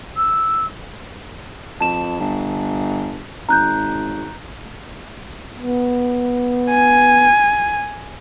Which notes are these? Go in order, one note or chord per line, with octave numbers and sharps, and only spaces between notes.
E6
F2 A5 E7
G1
G#1 A#5 F#6 G6
B3
G#5